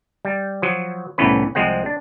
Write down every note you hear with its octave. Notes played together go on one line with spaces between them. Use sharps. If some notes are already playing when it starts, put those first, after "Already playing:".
G3
F3 F#3
C2 A2 E3 B3 C#4 B4
C2 F3 G#3 C4 F#5
D4